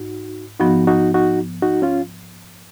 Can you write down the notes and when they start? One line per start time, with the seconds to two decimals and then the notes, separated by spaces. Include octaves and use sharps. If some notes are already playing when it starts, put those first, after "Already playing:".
Already playing: G#2 D#4 F#4
0.59 G#2 F3 B3 D#4 F#4
0.87 D#4 F#4
1.14 D#4 F#4
1.62 D#4 F#4
1.82 C#4 F4